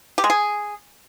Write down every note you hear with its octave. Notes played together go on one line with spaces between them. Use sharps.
G4
G#3
G#4